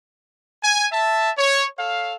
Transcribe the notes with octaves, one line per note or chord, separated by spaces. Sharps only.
G#5
E5 A5
C#5
A4 C#5 F5